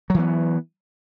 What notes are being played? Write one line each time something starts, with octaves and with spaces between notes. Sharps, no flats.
E3 F#3 B3